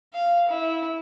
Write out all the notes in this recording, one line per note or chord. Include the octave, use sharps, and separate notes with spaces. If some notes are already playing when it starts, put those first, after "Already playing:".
F5
E4